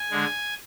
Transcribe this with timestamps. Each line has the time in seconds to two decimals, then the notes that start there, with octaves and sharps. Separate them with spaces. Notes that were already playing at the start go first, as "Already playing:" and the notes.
Already playing: G#5
0.11 D3 G#3